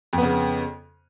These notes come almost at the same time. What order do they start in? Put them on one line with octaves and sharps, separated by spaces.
F2 B3 C#3